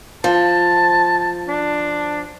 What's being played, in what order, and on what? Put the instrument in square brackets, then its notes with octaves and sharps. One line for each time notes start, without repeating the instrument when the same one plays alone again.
[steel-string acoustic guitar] F3 [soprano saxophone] A5
[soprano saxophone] D4